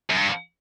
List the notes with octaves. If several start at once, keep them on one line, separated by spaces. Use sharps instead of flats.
F#2
G2